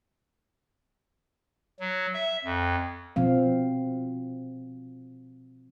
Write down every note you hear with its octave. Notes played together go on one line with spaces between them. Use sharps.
F#3
E5
F2
B2 F3 C4 F5